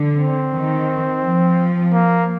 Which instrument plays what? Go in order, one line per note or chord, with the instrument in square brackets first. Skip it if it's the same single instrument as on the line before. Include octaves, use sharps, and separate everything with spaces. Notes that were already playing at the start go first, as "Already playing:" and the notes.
Already playing: [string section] D3
[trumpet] C4
[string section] D#3
F3
[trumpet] A#3